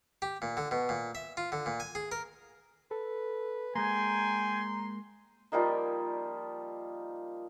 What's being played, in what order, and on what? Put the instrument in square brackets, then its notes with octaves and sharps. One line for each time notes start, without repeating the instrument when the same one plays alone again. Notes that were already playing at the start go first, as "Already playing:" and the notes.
[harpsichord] G4
A#2
D3
B2
A#2
E5
F4
D3
A#2
G#5
G#4
A#4
[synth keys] A4 [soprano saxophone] B4
[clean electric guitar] G#3 A#3 [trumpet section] G5 G#5 [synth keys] A#5 [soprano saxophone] C6
[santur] F3 G3 A#3 D#4